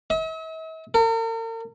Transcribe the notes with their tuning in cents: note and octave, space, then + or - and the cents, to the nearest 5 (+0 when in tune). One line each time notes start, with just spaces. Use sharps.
E5 -45
A#4 -45